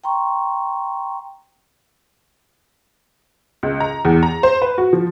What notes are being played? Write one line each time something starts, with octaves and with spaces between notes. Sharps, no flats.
G5 A#5 C6 C#6
C#2
A#5
E2
A#5
C5
B4
F#4
F3